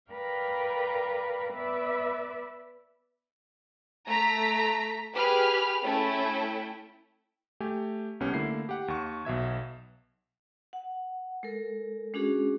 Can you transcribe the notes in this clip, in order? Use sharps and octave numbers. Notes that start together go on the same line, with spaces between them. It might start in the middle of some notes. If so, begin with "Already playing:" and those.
A#4 B4 D5 F5 G5 A#5
B3 B4 D5 E5
A3 A#5 B6
G4 G#4 B4 B5 F6
A3 C#4 E4 G5
A3 G4 G#5
C2 B3 C#4 G4
D3 A3 A#3 E4 C7
G4 F#5
D#2 C#6
B1 B2 E5 G#6
F#5
G#3 A4 A#4
G#3 C#4 D4 F#4 G#4